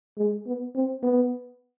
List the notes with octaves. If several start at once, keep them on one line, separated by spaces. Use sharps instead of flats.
G#3
B3
C4
B3